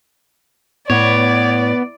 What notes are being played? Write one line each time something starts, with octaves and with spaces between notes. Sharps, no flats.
A2 B3 C#5 D5